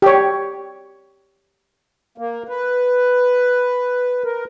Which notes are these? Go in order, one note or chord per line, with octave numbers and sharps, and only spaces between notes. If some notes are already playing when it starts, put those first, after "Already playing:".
G4 C#5
A#3
B4
A#4